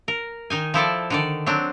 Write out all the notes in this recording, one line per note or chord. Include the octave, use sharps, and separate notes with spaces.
A#4
D#3 D#4 G#5
F3 E4 A4 D5
D3 D#3 D5
F#3 C4 D4